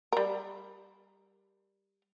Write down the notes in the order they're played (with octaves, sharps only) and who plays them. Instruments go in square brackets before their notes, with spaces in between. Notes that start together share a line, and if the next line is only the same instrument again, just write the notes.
[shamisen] G3 A#4